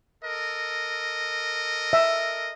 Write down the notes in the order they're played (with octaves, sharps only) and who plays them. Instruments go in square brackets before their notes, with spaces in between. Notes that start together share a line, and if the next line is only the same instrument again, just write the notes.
[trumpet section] A4 A#4 D#5
[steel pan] E5